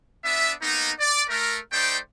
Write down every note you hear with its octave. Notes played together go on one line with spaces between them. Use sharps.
B3 D4 E5
A#3 B3 D#4
D5
A3 A#4
A3 D#4 C5 D5 G5